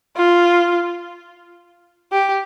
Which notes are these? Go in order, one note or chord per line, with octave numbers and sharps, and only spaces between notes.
F4
G4